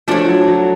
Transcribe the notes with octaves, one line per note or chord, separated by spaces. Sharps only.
F3 A3 D4 F#4 A4 C#5
F#3
F#3